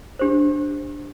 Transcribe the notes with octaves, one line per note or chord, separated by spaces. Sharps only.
D4 G4 C5